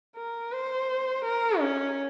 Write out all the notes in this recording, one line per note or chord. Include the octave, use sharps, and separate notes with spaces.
A#4
C5
A#4
C#4